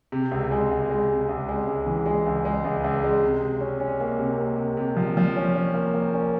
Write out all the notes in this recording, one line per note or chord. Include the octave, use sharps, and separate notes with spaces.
C3
C#2
G#3
C#2
G#3
C3
C#2
G#3
C#2
E3
G#3
C#2
G#3
C#2
C#2
G#3
C3
C3
C#4
C#4
A#3
C3
A#3
C3
C3
F3
F3
C#4
C#4
A#3
A#3
C#4